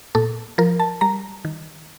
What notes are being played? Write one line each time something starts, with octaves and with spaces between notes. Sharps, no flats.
A#2 A4
F3 A#4
A5
G3 A#5
D#3